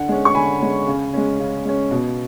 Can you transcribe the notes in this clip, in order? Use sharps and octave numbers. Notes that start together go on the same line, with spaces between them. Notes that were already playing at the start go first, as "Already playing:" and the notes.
Already playing: D3 F#5
G#3 C#4
C#6
D3 G#5 B5
G#3 C#4
C#3
G#3 C#4
C#3
G#3 C#4
B2